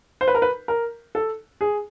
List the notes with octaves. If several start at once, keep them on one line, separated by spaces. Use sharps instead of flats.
C5
B4
A#4
B4
A#4
A4
G#4